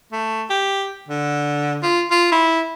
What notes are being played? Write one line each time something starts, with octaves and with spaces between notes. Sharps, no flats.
A3
G4
D3
F4
F4
E4